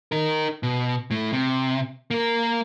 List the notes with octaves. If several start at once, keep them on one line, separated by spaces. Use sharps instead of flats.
D#4 A#4
B2
A2 A3
C3
A#3 A#4